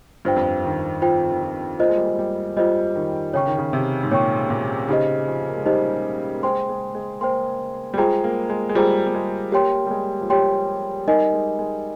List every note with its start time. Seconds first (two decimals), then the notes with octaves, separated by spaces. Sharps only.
0.25 G2 F4 C5 G5
0.36 F2
0.48 G2
0.64 D#3
1.02 F3 F4 C5 G5
1.31 D#3
1.41 F3
1.79 A#3 F4 C5 D#5
1.89 G#3
1.97 G3
2.05 G#3
2.19 G3
2.57 G3 F4 C5 D#5
2.95 D#3
3.34 C#3 C#5 G5 C#6
3.46 D#3
3.58 C#3
3.73 C3
4.03 G#2
4.11 A#2 C#5 G5 C#6
4.50 A#2
4.89 C#3 D#4 G4 C5 D#5
5.27 F3
5.49 A#3
5.57 G#3
5.66 G3 D#4 G4 C5 D#5
6.34 A#3
6.43 G#3 C5 G5 C6
6.69 G#3
6.95 G#3
7.21 A#3 C5 G5 C6
7.94 G3
7.97 G#3 F4 G#4 C5 G5 A#5
8.24 A#3
8.50 G#3
8.69 G#3
8.75 G3 F4 G#4 C5 G5 A#5
9.07 G3
9.14 G#3
9.52 A#3 G4 C#5 G5 C6
9.87 G3
9.91 G#3
10.21 F3
10.30 G3 G4 C#5 G5 C6
11.07 G3 D#4 A#4 D#5 G#5
11.33 G#3
11.59 G#3